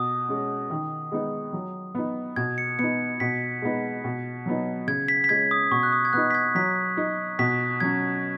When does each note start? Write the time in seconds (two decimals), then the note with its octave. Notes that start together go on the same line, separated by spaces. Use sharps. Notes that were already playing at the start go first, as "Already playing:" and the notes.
Already playing: B2 D#6
0.29 G#3 C#4
0.70 D#3
1.12 G#3 B3 D#4
1.53 F#3
1.95 B3 D#4
2.36 B2 G#6
2.58 C#7
2.79 B3 D#4 C#7
3.20 B2 B6
3.62 G#3 B3 D#4
4.04 B2
4.46 F#3 B3 D#4
4.87 C#3 G#6
5.08 B6
5.24 B6
5.29 G#3 C#4 G#6
5.51 D#6
5.71 B2 C#6
5.83 F#6
5.92 D#6
6.05 G#6
6.13 B3 D#4 F#6
6.31 B6
6.35 G#6
6.55 F#3 B6
6.97 D#4
7.39 B2 B6
7.80 F#3 C#4 G#6